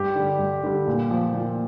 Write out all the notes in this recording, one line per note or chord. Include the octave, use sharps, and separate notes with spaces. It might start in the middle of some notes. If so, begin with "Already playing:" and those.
Already playing: G2 G4
D3 G3
G2
D3 G3
A#2
F3
A#2